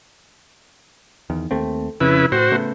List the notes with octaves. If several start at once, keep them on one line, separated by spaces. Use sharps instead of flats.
E2 D#3
D#2 A3 C4
F2 C#3 E4 B4
A2 F#4 C5
C#3 A3 B3